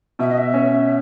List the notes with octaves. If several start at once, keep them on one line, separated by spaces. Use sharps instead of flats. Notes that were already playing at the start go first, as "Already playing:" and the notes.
B2 E5
D#5
E5
C#4